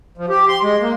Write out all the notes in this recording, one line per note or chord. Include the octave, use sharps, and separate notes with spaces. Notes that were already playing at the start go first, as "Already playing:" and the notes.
F3
G4
C6
G#3
A#3